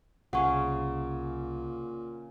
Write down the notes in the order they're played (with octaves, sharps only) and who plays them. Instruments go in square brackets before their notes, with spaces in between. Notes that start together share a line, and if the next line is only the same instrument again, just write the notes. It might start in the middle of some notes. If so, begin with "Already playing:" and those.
[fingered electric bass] C2 [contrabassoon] A#2 [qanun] C#3 G#4 F5 [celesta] F#5 C#6